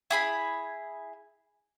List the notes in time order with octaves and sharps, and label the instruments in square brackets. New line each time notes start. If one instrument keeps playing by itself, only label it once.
[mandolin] E4 G#4 B5